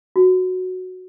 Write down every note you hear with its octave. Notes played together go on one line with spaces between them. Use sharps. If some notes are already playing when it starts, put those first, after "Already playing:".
F#4